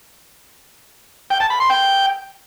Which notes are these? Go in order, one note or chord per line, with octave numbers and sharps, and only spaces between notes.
G5
A5
B5
C6
G5